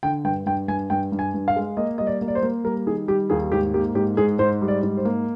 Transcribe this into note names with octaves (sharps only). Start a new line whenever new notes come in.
D3 G5
G2 G5
G2 G5
G2 G#5
G2 G5
G2
G#5
G2
F5
G#3
A#3 D#5
G3 D#5
D5
A#3
D5
C5
A#3
G3 A#4
D#3 G#4
G3 G4
D#2 G#4
G#2 G4
A#3 G4
G#2 G4
G#2 G#4
G#2 C5
G3
D5
G#2
C5
A#3